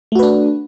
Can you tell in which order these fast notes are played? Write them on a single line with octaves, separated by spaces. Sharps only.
A3 F#4 B4 D4